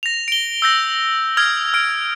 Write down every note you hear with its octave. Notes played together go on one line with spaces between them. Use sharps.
A#6 F7
D7 G7
E6 G6 A#6
D#6 F6 G#6
F6 D7